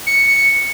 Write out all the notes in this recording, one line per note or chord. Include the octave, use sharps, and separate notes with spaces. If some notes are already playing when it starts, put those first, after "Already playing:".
C#7